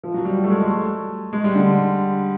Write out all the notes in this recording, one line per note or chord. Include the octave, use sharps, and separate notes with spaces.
F3
F#3
G3
A3
G#3
A3
G#3
G3
D3